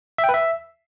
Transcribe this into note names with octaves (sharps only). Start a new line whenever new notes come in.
E5
G5
B4
E5